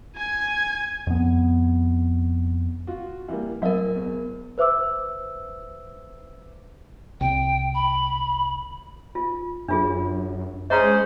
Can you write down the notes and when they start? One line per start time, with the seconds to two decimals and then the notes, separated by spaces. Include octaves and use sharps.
0.16 G#5 G#6
1.07 F2 B3
2.87 F4 F#4
3.28 E3 G3 A#3
3.62 A2 F#3 A#4 D#5 E5
3.96 E2
4.58 B4 C5 E5 D6 E6
7.21 C2 G5
7.75 B5
9.15 F4
9.68 F#2 D4 F4 G#4
10.70 G#3 C#4 G#4 C5 D#5 A#5